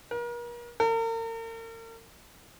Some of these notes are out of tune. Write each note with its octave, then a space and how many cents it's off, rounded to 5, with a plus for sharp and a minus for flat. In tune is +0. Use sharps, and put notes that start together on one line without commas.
A#4 +40
A#4 -40